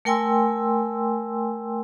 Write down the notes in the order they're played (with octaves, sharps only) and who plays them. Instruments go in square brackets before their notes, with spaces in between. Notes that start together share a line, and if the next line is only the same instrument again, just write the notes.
[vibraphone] A3 A#4 G5 G#5 C6 E6